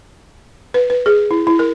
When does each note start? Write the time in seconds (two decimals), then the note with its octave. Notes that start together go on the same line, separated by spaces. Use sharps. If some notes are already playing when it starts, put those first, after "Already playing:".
0.74 B4
0.90 B4
1.06 G#4
1.31 E4
1.47 E4
1.59 A#4